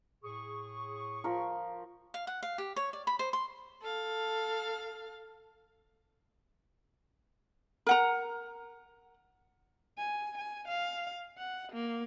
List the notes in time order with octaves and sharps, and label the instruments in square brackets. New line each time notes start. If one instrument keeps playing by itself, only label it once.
[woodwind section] A2 G#4 C#6
[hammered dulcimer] F3 A#4
[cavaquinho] F5
F#5
F5
G4
C#5
D5
B5
C5
C6
[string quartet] A4 F5
[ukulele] A#4 F#5 A#5
[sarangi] G#5
G#5
F5
F#5
A#3